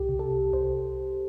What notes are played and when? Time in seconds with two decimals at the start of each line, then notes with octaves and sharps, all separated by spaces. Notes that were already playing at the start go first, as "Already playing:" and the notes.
Already playing: C2 G4
0.09 C3
0.19 A4
0.31 C2
0.53 C2 C5